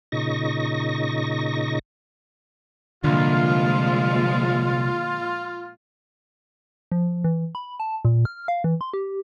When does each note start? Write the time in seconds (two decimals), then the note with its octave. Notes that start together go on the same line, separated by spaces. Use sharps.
0.12 A#2 C#3 D#4 D#5 C#6 A#6
3.04 C2 A#2 D3 F3 G#3 F4
6.92 F3
7.24 E3
7.55 B5
7.80 A5
8.05 A#2
8.25 F6
8.48 F5
8.64 E3
8.81 C6
8.93 G4